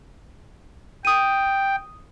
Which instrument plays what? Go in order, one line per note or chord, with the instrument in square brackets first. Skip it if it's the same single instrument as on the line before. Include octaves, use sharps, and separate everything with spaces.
[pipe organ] G5 [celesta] D#6 D#7